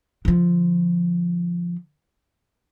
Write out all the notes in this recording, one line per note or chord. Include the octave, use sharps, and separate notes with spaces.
D3 F3